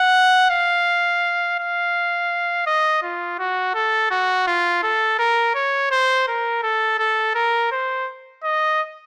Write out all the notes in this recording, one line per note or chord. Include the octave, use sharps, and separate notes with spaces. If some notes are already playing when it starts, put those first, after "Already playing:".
Already playing: F#5
F5
F5
D#5
F4
F#4
A4
F#4
F4
A4
A#4
C#5
C5
A#4
A4
A4
A#4
C5
D#5